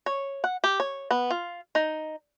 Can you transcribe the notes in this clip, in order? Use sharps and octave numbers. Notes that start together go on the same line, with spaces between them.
C#5
F#5
G4
C#5
B3
F4
D#4